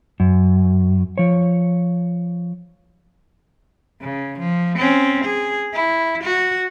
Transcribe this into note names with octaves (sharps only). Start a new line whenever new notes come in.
F#2
F3 C#5
C#3
F3
C4 C#4
G#4
E4
F#4